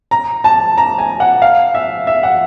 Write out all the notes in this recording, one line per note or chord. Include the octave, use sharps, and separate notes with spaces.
A#5
A5
A#5
G#5
F#5
F5
E5
E5
F#5